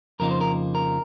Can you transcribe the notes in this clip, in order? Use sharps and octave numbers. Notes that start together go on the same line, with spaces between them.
F2 C#3 F3 A#3 D#4 A#4
C5
A#4
A#4